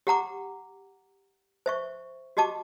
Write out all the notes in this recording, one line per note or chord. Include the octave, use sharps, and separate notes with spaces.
G4 F#5 A#5 D6
C5 E5 C#6
F#4 G4 D#5 A5 D6